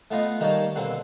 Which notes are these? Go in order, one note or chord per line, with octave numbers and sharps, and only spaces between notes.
A3 B3 F4 D#5
D#3 G3 A#3 A#4 C#5 A5
B2 D3 A#3 C4